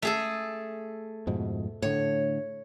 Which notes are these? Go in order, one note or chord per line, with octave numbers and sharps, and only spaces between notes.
A3 G#4 A4
F2 G#2 B2
A2 D3 C#5